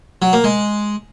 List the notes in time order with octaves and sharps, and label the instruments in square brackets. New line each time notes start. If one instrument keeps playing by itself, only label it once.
[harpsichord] F#3
A#3
G#3